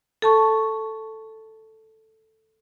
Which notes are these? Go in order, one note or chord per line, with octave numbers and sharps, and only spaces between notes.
A4 A5 C#6